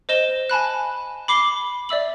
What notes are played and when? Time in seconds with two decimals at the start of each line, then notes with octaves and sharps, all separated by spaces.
0.09 C5 D#5 E7 G7
0.49 G#5 A5 B5 F#6
1.28 B5 D6 C7 G7
1.89 D5 E5 E6 F#7